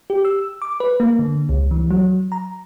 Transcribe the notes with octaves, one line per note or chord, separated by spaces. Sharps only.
G4
E6
D6
B4
A#3
D3
C#2
E3
F#3
A#5